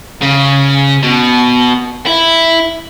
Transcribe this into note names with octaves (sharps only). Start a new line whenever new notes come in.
C#3
B2
E4